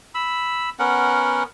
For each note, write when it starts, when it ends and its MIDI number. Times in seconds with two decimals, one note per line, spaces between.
0.15 0.70 83
0.15 0.70 88
0.79 1.43 59
0.79 1.43 61
0.79 1.43 70
0.79 1.43 78